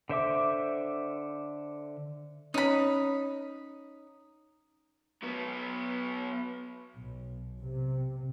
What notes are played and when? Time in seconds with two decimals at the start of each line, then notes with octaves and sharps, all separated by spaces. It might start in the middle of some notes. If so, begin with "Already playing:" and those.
0.09 D3 C5 E5 D6
2.54 C#4 D#4 C#5 B5
5.23 F#3 B3
6.96 B1
7.62 C3